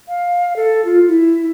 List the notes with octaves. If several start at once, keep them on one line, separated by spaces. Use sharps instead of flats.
F5
A4
F4
E4